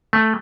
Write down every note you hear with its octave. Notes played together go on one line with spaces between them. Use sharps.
A3